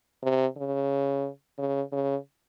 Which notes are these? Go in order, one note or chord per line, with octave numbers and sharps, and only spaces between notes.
C3
C#3
C#3
C#3